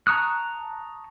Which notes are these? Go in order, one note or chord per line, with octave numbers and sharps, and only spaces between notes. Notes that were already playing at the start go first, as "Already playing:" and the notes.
A5 A#5 C#6 D#6 F#6